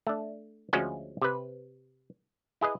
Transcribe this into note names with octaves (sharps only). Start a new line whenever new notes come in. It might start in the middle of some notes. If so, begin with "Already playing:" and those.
A3 D4
D2 F3 G#3 C#4 F#4
C3 B4
E4 G#4 B4 D#5